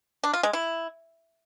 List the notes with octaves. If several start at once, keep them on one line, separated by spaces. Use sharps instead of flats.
D4
F4
G#3
E4